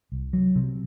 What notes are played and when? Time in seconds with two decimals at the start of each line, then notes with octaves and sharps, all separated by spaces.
0.12 C2
0.33 F#3
0.56 C3